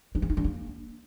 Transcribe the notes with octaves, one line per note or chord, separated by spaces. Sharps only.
D4
C#4
D#4
D4
A#3